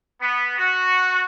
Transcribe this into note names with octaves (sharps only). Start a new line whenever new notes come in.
B3
F#4